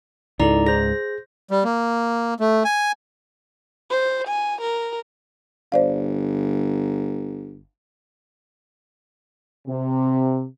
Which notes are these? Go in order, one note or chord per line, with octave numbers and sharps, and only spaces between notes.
C#2 G#2 D#4 E4 A4 D5 A#5
G#4 C5 A#6
G3
A#3
A3
G#5
C5
G#5
A#4
G1 C5 D5 F5
C3